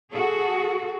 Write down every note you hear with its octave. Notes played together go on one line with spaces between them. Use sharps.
F#4 G#4 A4